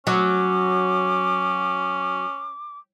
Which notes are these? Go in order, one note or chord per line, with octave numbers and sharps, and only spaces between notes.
F#3 C#4 D6